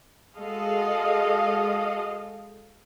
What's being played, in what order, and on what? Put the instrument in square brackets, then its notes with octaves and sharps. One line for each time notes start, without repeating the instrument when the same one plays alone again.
[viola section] G#3 F#4 A4 D#5 F5